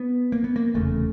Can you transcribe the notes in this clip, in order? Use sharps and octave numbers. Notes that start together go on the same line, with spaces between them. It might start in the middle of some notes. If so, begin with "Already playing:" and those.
Already playing: B3
A#3
B3
A#3
F1 E2 C#3 A3